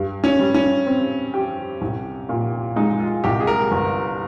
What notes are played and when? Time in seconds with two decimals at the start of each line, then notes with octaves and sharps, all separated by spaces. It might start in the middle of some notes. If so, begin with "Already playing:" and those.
Already playing: G2
0.24 C#4
0.39 G3
0.54 C#4
0.87 C4
1.34 G4
1.81 C2
2.29 A#2
2.76 G#3 D#4
3.00 F4
3.24 C2 G4
3.40 G#4
3.47 A#4
3.71 G1